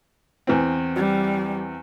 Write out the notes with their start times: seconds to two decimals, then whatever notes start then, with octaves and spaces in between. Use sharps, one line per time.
0.47 E2 E3 C4
0.96 G3